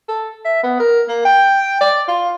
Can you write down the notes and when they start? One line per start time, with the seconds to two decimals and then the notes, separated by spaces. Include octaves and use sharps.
0.08 A4
0.45 E5
0.63 B3
0.80 A#4
1.08 A#3
1.25 G5
1.81 D5
2.08 F4